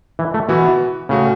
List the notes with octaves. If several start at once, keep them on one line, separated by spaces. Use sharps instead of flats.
E3
A3
B2 E3 B3 F#4
A2 C#3 A3 F#4